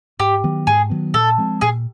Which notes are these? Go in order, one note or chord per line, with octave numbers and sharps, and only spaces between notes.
G#2 G4
D#3 F#3 B3
G#2 G#4
D#3 F#3 B3
A#2 A4
F3 G#3 C4
A#2 G#4